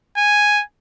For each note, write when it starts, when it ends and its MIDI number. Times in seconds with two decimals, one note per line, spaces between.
0.17 0.63 80